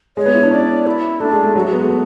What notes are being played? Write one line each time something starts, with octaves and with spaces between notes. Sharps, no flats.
G#3 C#5
B3
E4
D4
C#4 D5
E4
A3 D4
G#3
A3
F#3 F#4
G#3
B3
A3
B3